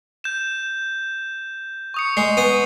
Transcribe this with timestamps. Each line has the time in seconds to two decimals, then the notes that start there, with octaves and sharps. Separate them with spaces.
0.24 G6 E7
1.94 C#6 D#6 C#7
2.17 G#3 C7
2.37 B3